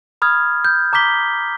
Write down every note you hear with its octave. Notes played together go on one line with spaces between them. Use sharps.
B5 D#6 F6 G#6
G6
A#5 D6 G6 B6 G7